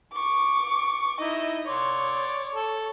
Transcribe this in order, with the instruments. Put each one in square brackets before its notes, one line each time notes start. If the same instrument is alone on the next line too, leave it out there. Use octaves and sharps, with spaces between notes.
[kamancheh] C#6 D6
[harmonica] D#4 E4 [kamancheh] D#5
[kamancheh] C#5 [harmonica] D5 C6
[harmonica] A4